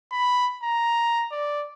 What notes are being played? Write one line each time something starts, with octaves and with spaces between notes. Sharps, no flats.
B5
A#5
D5